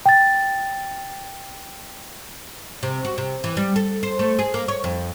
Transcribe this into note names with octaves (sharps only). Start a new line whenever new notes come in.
G5 A6
C3
F#4
C3
E3
G3
A4
C5
A3
G#4
A#3
C#5
F2